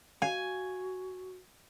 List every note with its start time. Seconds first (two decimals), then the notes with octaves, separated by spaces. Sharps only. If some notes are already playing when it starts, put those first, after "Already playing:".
0.22 F#4 F5 G#5